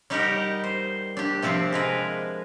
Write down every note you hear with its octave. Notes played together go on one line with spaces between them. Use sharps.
G3 D#4 G4 A#4 D#5 F#5
C5
D4 G4
C3 F3 C4 D4
G#3 A#4 B4